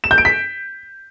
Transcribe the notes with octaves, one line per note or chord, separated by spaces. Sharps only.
E7
G6
D7
B6